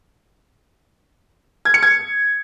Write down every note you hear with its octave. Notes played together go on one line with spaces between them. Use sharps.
G#6
C#7
G#6